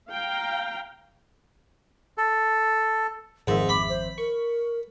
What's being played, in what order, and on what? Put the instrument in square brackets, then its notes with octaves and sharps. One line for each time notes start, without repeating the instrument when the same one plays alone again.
[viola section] F5 G5 A#5
[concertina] A4
[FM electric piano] G#1 F2 E5 [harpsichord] G#2 [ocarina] A#4
[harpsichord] B5 [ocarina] D6
[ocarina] C5
[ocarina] A#4 [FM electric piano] C#6